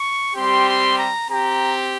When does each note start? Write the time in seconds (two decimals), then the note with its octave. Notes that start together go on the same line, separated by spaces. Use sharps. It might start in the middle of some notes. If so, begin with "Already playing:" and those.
Already playing: C#6
0.35 G3 C4 G4 C6
0.67 C6
0.98 A#5
1.29 C4 G4 A#5